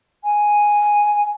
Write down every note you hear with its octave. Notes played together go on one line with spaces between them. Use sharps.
G#5